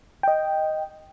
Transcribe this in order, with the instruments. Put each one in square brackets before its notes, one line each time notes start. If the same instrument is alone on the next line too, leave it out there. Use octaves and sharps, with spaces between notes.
[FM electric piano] D#5 G5